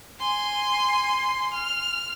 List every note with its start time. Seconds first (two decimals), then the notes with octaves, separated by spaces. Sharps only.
0.20 G#5 C6
1.54 F6